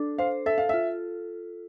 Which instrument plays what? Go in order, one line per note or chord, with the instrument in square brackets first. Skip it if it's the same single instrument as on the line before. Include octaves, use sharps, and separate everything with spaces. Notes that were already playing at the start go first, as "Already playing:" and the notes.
Already playing: [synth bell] D4 A4
[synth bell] C5 [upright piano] F5
[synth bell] A4 [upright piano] E5
[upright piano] F5
[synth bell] F4 [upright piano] E5